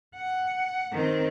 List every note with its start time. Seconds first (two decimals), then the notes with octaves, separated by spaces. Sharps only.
0.15 F#5
0.92 D#3 C4